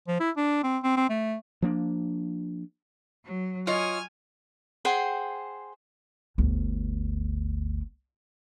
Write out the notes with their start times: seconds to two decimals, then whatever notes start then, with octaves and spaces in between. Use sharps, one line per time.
0.08 F3
0.20 E4
0.37 D4
0.63 C4
0.83 C4
0.97 C4
1.09 A3
1.62 F3 A#3 D4
3.25 F#3
3.67 F4 C#5 D#5 G#5 F6
4.85 G#4 C5 F#5 G5
6.38 G1 D2